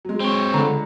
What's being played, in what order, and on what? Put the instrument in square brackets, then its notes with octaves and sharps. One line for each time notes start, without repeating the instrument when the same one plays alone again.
[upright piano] F#3 G#3
[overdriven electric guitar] C4 C#5
[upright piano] C#2 [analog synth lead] D3 [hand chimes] A#5